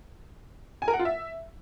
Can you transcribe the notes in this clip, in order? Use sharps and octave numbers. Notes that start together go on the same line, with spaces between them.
G#5
A#4
F#5
F4
E5